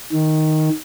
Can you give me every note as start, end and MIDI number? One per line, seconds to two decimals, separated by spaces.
0.12 0.69 51